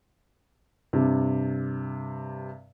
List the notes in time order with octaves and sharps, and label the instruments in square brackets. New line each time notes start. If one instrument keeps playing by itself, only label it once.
[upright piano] G2 C3